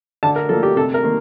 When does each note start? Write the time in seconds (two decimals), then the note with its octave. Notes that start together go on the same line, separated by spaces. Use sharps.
0.23 D3 A5
0.36 A#4
0.49 F3 A#3 A4
0.63 G4
0.76 C3 A4
0.94 A#4
1.03 D#3 A#3